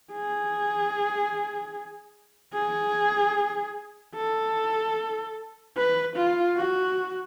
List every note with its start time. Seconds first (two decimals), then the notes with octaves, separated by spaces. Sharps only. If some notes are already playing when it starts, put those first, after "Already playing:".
0.12 G#4
2.54 G#4
4.15 A4
5.76 B4
6.17 F4
6.57 F#4